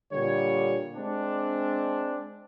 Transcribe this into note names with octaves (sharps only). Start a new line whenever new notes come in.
A#2 D3 G3 C#5
G#3 C4 D4